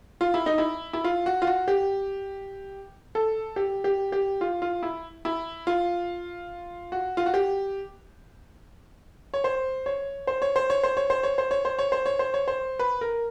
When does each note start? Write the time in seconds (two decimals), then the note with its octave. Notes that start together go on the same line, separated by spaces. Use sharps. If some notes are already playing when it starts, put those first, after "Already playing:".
0.21 F4
0.34 E4
0.46 D#4
0.58 E4
0.93 E4
1.04 F4
1.26 F#4
1.42 F4
1.47 F#4
1.68 G4
3.15 A4
3.56 G4
3.84 G4
4.12 G4
4.41 F4
4.62 F4
4.83 E4
5.25 E4
5.67 F4
6.92 F#4
7.17 F4
7.26 F#4
7.34 G4
9.34 C#5
9.44 C5
9.86 C#5
10.27 C5
10.42 C#5
10.56 C5
10.70 C#5
10.83 C5
10.97 C#5
11.10 C5
11.23 C#5
11.38 C5
11.51 C#5
11.65 C5
11.79 C#5
11.92 C5
12.06 C#5
12.19 C5
12.34 C#5
12.48 C5
12.79 B4
13.01 A#4